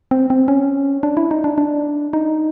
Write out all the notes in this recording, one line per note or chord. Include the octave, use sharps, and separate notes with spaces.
C4
C4
C#4
D4
E4
D#4
D4
D4
D#4